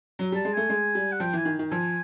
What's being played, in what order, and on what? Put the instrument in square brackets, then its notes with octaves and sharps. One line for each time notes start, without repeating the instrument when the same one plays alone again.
[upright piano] F#3
[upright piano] G3 [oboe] A5
[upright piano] G#3
[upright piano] A3 [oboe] G#5
[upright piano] G#3
G3
[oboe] F#5
[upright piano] F3 [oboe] G5
[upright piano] E3 [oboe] G#5
[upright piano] D#3
D#3
[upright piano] F3 [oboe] G#5